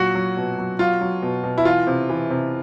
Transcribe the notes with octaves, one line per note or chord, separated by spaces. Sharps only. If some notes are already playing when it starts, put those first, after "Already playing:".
Already playing: A#2 F#3 F#4
F#3
B2
F#3
F#3 F4
F#3
B2
B2
E4
E3 F4
C3
E3
C3